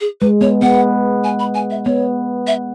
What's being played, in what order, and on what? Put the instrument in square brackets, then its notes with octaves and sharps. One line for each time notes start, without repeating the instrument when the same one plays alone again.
[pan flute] G#4
[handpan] G#3 [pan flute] B4
[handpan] B3 [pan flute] C#5
[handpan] B3 [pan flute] F#5
[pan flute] G#5
B5
G#5
E5
[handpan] B3 [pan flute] C#5
[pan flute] E5